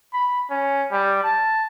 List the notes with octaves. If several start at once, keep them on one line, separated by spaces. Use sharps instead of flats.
B5
C#4
G3
A5